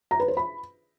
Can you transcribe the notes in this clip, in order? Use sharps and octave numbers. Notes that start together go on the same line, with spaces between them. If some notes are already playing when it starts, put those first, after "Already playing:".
A#5
B4
C5
B5